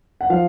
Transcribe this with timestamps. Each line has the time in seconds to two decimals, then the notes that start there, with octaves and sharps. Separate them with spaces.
0.21 F#5
0.30 F3 F5